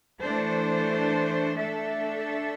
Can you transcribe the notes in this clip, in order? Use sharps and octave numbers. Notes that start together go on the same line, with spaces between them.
E3 A3 D4 A4 C5
A3 D4 A4 E5